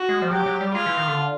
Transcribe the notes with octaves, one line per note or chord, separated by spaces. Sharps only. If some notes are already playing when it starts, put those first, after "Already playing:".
Already playing: F#4
G#3
F3
F#3 G4
F#3
G3
G#3 F4
E3
D#3
D3